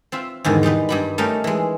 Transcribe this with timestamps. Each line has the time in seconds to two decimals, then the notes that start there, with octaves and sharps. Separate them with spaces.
0.12 C4 F4 E5
0.45 E2 G#2 D3 D#3
0.63 G3 G#3 D#4 B4
0.89 G2 G3 B5
1.18 G3 A3 C#4 D#4 A#4
1.44 E3 G#3